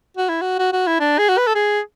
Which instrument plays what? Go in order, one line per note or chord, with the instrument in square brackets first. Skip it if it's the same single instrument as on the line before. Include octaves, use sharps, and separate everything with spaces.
[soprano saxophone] F#4
E4
F#4
F#4
F#4
E4
D4
G#4
F#4
B4
A4
G#4